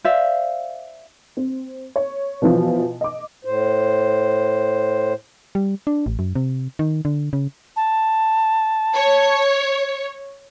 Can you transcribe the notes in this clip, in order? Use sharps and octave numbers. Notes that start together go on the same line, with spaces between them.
C5 D5 E5 F5
C4
C#5
B2 E3 F3
D#5 D6
A2 C5
G3
D4
A1
F#2
C3
D#3
D3
C#3
A5
C#5